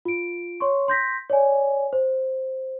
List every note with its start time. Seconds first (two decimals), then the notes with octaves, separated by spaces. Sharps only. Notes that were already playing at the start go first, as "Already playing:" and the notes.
0.05 F4 D7
0.60 C#5 C6 C#6
0.88 C6 G6 A#6 B6
1.30 C#5 D5 G#5
1.93 C5